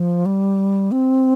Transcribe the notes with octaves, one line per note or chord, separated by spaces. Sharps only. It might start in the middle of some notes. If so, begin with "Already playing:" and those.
Already playing: F3
G3
C4